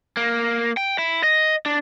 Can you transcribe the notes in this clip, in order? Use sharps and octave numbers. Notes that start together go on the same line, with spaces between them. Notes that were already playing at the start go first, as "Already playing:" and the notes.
A#3
G5
E4
D#5
D4